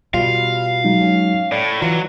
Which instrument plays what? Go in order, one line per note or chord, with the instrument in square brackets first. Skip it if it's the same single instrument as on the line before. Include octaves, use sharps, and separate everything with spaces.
[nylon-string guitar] B2 G3 F4 [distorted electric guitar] F5
[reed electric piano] F#3 G#3 D#4
[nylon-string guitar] C#4
[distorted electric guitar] A2 [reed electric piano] D5
[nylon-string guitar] E3 F4 [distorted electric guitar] F#3